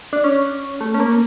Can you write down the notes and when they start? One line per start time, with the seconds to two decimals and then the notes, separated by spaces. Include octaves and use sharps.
0.13 D4
0.24 C#4
0.81 A3
0.94 C#4
1.00 A#3